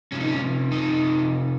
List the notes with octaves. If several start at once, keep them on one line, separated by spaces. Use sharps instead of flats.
C3 F3 C#4
D#4
C#4
D#4